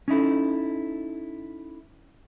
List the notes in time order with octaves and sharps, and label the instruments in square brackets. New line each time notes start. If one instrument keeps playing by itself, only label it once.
[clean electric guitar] C#4 D#4 E4 A4